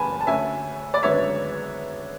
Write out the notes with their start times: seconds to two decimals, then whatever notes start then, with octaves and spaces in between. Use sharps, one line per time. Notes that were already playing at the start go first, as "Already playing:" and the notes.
Already playing: F#1 E2 C#3 A3 G#5 A5 B5
0.21 A5
0.27 D2 D3 A3 C#4 E5 G#5
0.94 D5
1.03 G#1 F#2 D3 G#3 B3 C#5 E5